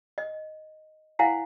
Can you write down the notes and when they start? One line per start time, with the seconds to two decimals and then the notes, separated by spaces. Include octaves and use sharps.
0.18 D#5
1.19 E4 C5 F5 F#5 G#5 A#5